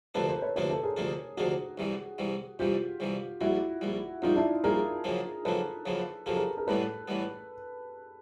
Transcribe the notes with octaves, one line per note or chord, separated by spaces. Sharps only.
D2 C3 F3 A#3 D4 A4 B4
A#4 C5
B4 C#5
D2 C3 F3 A#3 D4 B4 C#5
A4 B4
G#4 A#4
D2 C3 F3 A#3 D4
D2 C3 F3 A#3 D4 F#4 G#4
C2 C3 E3 G3
C2 C3 E3 G3
C2 C3 E3 G3 F4 G4
C2 C3 E3 G3
A#1 A#2 G3 E4 F#4
A#1 A#2 G3
A#1 A#2 G3 D#4 F4
D4 E4
A#1 A#2 G3 G#4 A#4
F#2 C#3 F3 A#3
F#2 C#3 F3 A#3 A4 B4
F#2 C#3 F3 A#3
F#2 C#3 F3 A#3 G4 A4
G#4 A#4
G#4 A#4
A1 A2 E3 G3 B3 A4 B4
A1 A2 E3 G3 B3